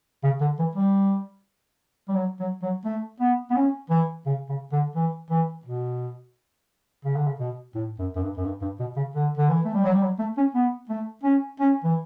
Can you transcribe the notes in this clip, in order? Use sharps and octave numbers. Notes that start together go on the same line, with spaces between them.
C#3
D3
E3
G3
G3
F#3
F#3
F#3
A3
B3
B3
C#4
E3
C#3
C#3
D3
E3
E3
B2
C#3
D3
C#3
B2
A2
F#2
F#2
G2
F#2
G2
G2
B2
C#3
D3
D3
E3
A3
G3
F#3
G3
F#3
A3
C#4
B3
A3
C#4
C#4
E3